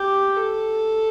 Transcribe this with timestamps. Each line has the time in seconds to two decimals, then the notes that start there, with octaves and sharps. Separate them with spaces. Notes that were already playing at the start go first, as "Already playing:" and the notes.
Already playing: G4
0.37 A4